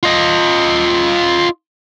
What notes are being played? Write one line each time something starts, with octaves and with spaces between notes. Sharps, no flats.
F4 D#5